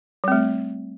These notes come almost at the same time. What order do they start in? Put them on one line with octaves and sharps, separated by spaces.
G3 C4 A3